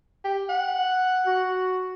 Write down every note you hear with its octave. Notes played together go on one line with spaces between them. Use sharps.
G4
F#5
F#4